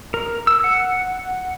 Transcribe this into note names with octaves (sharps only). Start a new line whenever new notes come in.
A#4
E6
F#5